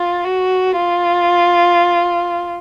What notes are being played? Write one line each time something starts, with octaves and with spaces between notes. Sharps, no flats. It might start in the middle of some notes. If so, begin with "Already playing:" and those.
Already playing: F4
F#4
F4